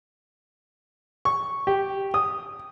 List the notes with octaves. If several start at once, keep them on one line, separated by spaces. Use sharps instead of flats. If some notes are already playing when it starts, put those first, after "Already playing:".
C#6
G4
D#6